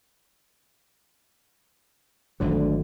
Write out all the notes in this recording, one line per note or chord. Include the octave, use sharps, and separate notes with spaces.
G#1 D2 D3 F#3